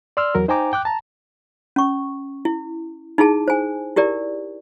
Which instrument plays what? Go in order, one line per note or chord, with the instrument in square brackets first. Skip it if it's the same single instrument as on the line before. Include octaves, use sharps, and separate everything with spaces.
[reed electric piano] D5 C6 E6 F6
E2 F#3 A#4
D#4 C5 G5 G#5 A#5 D6
G5 D6 F#6
A5 A#5
[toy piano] C#4 C#6
E4
D#4 E4 G#4 A5
C5 G#5
E4 G4 A#4 D5